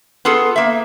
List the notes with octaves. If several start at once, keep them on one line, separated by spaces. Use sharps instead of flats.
B3 F4 G#4 A4
A#3 E5